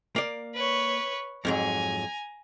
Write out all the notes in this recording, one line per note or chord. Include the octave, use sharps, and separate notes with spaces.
A#3 D5
B4 C#5
F2 G#2 F#3 G#5 A#5